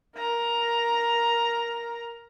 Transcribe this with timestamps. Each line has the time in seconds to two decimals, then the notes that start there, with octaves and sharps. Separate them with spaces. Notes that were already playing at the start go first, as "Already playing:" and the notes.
0.16 A#4 A#5